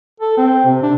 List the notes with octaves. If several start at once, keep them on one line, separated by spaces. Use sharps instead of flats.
A4
C4
C3
D4